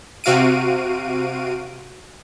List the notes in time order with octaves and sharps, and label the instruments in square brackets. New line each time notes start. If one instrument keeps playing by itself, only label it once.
[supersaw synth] C3 F#4 F5 D7 D#7